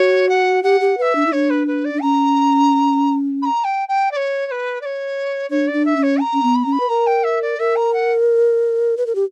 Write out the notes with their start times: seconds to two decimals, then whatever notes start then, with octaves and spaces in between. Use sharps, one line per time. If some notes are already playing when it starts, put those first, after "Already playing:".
Already playing: F#4 C#5
0.29 F#5
0.63 G4 F#5
0.81 G4
0.98 B4 E5 F#5
1.15 D4
1.26 E4
1.32 D4 C#5
1.50 B4
1.67 B4
1.84 D5
1.94 D4
2.01 C#4 A#5
3.42 B5
3.45 A#5
3.64 G5
3.88 G5
4.11 D5
4.16 C#5
4.46 C#5
4.51 B4
4.81 D5
4.85 C#5
5.50 D4 C#5
5.67 D5
5.73 D4
5.85 E5
5.97 C#4
6.02 C#5
6.20 A#5
6.33 C#4
6.43 B3
6.55 B5
6.63 C#4 A#5
6.72 B5
6.80 B4
6.89 A#4 A#5
7.06 G5
7.23 E5
7.41 D5
7.59 A#4 E5
7.75 A#5
7.93 F#5
8.97 B4
9.07 A#4
9.15 G4